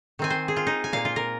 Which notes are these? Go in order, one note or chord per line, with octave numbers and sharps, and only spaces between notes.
D#3 C4 G#5
C5
G#4
F4
D#4
G#5
A#2 A#3 F5
F4
A#4